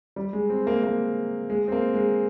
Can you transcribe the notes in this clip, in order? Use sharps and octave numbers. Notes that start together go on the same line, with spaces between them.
G3
G#3
C4
A#3
A#3
G#3
C4
A#3
G#3